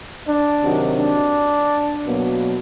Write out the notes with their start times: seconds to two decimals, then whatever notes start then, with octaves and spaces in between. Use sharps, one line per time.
0.28 D4
0.63 C3 D#3 F#3
0.99 D4
2.06 B2 F#3 A#3